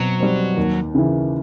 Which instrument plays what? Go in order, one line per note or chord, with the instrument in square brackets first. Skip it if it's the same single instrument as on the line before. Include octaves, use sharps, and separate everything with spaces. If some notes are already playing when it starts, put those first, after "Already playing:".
Already playing: [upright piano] B2 C4 [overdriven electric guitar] F#3
[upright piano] G3 C4
D#2
C#3 E3